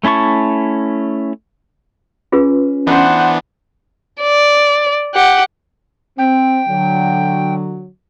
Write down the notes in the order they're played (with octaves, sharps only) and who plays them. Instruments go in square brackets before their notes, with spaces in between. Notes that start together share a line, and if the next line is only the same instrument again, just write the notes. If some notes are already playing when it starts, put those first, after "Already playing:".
[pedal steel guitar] A3 C#4 E4 A5 C#6
[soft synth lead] C#4 [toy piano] F4 G#4 B4
[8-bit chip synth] E3 B3 D4 [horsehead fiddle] C5 F#5
[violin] D5
G4 F#5
[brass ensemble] C4 [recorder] G5
[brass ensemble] D3 F#3